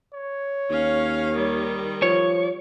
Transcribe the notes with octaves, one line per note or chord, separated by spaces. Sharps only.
C#5
D#2 C#4 F5
D#3 G3
F3 C#5